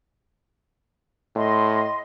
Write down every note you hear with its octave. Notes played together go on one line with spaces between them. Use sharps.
A2 D#5 C6